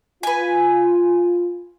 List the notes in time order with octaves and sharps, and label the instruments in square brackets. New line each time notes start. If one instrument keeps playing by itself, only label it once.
[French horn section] F4 [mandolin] B4 G#5